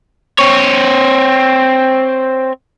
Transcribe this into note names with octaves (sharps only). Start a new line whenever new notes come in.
C4 C#5